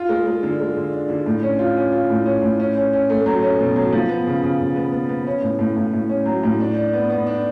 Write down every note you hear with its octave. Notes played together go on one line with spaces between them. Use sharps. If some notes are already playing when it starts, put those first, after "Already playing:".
Already playing: F4
G#3
G#3
D3
G#3
D3
D4
D3
A2
C#4
F4
C#4
F4
A2
C#4
A2
C#4
C#4
C#4
A3
F#3
C#4
B2
F#3
F3
B3
C#3
C#3
C#3
B3
B3
B3
C#4
A2
A2
A2
A2
C#4
F#3
A2
D4
D4
B3
B3
D4